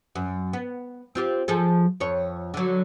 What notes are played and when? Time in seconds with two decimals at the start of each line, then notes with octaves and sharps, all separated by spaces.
0.15 F#2
0.53 B3
1.15 C4 F4 G4
1.48 F3 G#4 A4
2.00 F2 C#5
2.54 D3 F#3